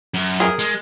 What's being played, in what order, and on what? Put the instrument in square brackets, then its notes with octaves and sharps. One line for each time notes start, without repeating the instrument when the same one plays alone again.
[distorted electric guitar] F#2
[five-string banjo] G#4 A#4
[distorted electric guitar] G#3